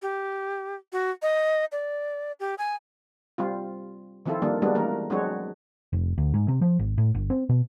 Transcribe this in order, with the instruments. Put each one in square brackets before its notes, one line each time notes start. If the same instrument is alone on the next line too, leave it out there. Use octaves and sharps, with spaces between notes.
[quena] G4
F#4
D#5
D5
G4
G#5
[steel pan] G3 C4 F4
D#3 F3 C4 E4 F4 A4
D#3 G3 A#3 D4
G3 G#3 A#3 B3 D4 F#4
E3 A3 A#3 A#4
F#3 G#3 C4 D4 F#4 C#5
[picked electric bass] F1
D2
G#2
C3
F3
G#1
A2
G1
C4
B2